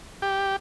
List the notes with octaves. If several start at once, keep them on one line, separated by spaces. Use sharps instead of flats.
G4